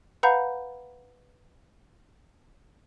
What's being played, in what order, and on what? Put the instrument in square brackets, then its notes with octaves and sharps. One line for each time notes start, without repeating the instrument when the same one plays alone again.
[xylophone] B4 F5 F#5 A#5 B5 G6